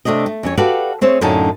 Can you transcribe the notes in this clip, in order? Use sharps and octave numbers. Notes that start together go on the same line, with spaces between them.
C3 A3 D4 D5 D#5
A3
F2 C#4 C#5
F#4 G4 A4 B4 D5 F5
A3 C4 G#4 C5 C#5
F#2 A2 D3 C#4 D#4 A5